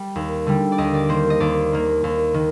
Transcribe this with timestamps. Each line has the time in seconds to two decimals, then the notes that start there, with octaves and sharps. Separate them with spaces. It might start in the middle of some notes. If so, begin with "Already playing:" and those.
Already playing: G3
0.16 D#2
0.47 D3 G3
0.72 D5
0.78 D#2 D#5
0.94 D5
1.09 D#3 A#3 C5
1.30 D#5
1.40 D#2 D5
1.73 D#3 A#3
2.04 D#2
2.34 D#3